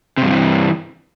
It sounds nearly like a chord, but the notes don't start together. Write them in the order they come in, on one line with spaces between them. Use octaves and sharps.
C3 G2 F3 E3